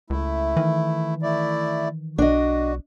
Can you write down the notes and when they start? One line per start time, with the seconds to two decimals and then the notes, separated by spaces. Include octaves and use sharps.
0.10 C#2 A3 E4
0.57 D#3 E3
1.22 A3 E4 D5
2.18 B1 D4 F#4 D#5